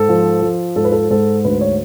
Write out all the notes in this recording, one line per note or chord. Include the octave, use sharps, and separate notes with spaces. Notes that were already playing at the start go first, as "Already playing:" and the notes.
Already playing: G#2 A4
F3
F3
G#2 A4
B4
A4
G#2 A4
D2 B4
C#5